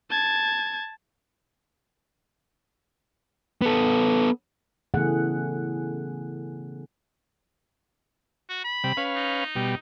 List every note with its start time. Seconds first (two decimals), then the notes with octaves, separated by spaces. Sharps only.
0.11 A5 G#6
3.62 B3 A4
4.94 C#3 E3 A3 B3 G#4 F#5
8.49 F#4
8.64 B5
8.84 C3 G3
8.97 C#4 B4 F5
9.16 D#4
9.56 B2 G3